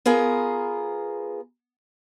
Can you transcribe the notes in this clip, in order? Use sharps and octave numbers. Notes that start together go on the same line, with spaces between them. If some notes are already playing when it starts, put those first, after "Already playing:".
B3 F4 G#4 A#4